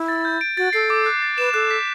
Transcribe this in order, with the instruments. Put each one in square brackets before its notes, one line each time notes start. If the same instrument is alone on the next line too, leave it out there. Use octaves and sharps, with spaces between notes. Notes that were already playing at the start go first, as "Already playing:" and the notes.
Already playing: [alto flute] E4
[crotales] A6
G6
D7
[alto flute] F#4 [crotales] A6
[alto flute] A4 [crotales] C7
[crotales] D6
F#6
A6
[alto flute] B4 [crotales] E7
[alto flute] A4 [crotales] F#6
[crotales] B6